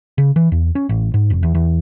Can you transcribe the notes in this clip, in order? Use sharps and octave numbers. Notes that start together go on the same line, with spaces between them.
C#3
E3
E2
C#4
A1
G#2
F1
E2
E2